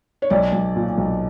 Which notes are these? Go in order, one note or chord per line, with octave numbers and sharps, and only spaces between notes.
C#5
B1 D5
B1
A#2
B1